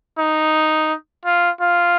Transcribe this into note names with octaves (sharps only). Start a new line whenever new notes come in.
D#4
F4
F4